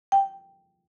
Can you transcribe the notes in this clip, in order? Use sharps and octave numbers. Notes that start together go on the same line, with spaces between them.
G5